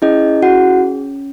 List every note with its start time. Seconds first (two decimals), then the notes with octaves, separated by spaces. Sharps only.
0.02 C#4 E4 G#4 D#5
0.42 F#4 F#5